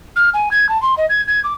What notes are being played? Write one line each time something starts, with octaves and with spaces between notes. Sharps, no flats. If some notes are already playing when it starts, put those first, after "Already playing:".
F6
G#5
G#6
A5
C6
D#5
G#6
G#6
D6